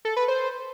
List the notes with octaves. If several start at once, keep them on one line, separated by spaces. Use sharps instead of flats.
A4
B4
C5